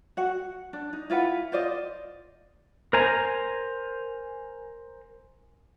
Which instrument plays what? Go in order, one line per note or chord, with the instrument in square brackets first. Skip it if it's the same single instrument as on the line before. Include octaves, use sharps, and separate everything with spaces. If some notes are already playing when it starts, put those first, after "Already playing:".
[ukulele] F#4 F#5
D4
D#4
E4 F4 B4 F#5
F4 C5 D5 D#5
[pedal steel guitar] A#4 C5 G#5 A#5